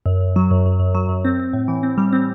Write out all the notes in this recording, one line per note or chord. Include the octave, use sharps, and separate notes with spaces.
F#2
F#2
F#3
F#2
F#2
F#2
F#3
F#2
C4
C4
A2
E3
C4
G3
C4